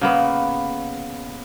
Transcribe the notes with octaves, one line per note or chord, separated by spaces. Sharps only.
C#3 A#3 B3